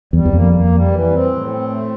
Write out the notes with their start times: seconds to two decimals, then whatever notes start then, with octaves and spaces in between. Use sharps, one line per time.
0.13 E2 G3
0.25 E2
0.33 F2 A#3
0.53 A#3
0.72 G3
0.91 E3
1.11 C4
1.31 A2
1.50 C4
1.70 A3